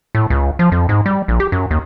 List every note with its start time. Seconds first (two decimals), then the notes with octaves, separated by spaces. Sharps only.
0.15 A2
0.30 C#2
0.59 F3
0.72 F2
0.89 G#2
1.06 G3
1.28 A#1
1.40 G4
1.52 F#2
1.71 D#2